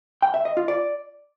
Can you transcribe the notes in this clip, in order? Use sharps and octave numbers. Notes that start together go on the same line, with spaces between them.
G5
E5
D#5
F4
D5